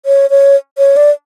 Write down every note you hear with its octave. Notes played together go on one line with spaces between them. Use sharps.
C#5
C#5
C#5
D5